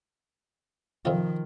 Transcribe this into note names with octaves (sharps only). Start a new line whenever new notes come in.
F2 C3 D#3 F3 F4